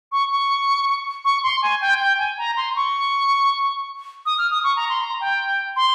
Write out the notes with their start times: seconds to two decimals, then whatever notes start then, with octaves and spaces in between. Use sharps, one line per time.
0.12 C#6
0.30 C#6
1.25 C#6
1.43 C6
1.62 G#5
1.81 G5
2.00 G5
2.19 G#5
2.38 A#5
2.57 C6
2.76 C#6
4.26 D#6
4.38 F6
4.51 D#6
4.64 C#6
4.76 A#5
4.89 C6
5.01 A#5
5.21 G5
5.76 C6